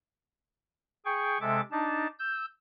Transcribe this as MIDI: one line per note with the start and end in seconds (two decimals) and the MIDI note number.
1.05 1.38 68
1.05 1.38 79
1.05 1.38 85
1.41 1.61 48
1.41 1.61 56
1.41 1.61 69
1.41 1.61 76
1.41 1.61 86
1.71 2.07 62
1.71 2.07 63
1.71 2.07 81
2.19 2.45 88
2.19 2.45 91